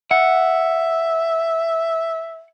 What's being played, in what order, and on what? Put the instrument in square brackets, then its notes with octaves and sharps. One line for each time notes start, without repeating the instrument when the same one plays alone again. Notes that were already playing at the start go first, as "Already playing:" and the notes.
[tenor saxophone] E5 [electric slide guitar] F#5